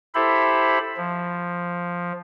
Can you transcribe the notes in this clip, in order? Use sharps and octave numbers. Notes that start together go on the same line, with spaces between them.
E4 G4 A4 C5 E5 B5
F3